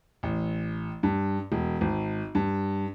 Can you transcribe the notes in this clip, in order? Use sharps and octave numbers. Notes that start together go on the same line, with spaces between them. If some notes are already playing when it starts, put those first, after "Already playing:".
A1
G2
E1
G#1
G2